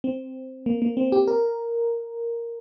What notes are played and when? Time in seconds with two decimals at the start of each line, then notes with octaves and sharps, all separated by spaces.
0.04 C4
0.66 A#3
0.82 A#3
0.97 C4
1.12 G4
1.28 A#4